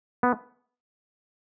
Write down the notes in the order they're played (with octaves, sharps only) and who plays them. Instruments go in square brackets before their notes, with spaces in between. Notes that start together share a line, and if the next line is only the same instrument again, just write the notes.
[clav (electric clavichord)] B3